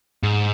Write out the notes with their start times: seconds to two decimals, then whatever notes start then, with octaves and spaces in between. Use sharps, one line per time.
0.23 G#2